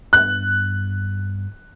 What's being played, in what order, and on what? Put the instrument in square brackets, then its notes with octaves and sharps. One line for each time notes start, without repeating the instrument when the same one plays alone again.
[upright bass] G2 B3 [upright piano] F#6